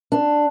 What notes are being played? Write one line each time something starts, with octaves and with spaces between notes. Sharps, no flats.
D4